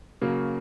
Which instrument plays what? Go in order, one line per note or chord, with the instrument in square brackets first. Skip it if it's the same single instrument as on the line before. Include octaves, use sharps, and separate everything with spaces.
[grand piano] C#3 F#3 A#3